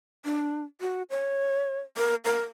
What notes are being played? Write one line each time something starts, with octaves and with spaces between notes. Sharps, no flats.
D4
F#4
C#5
A#4
A#4